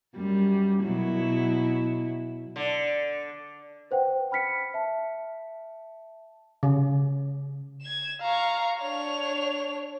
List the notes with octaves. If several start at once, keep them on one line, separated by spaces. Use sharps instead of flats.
F#2 G3
B2 F#3 E4
D3
B4 C5 F#5 G5
G5 B5 F6 B6 C#7
E5 A5
C#3
G#6 E7
F5 A#5 C#6
D4 C#5 F7